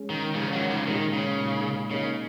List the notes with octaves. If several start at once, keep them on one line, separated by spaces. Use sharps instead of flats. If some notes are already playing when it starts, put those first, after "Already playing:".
Already playing: G#3 C#4 G#4
D#3
C#3 F3 G#3 C#4 G#4
D#3 F#3
C#3 F3
A#2 D#3 G#3 D#4
C#3
A#2 G#3 D#4
C#3 A#3 D#4 A#4 C#5